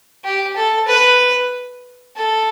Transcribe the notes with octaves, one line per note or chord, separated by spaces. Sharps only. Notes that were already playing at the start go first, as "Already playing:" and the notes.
G4
A4
B4
A4